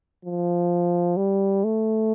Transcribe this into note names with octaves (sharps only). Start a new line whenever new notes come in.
F3
G3
A3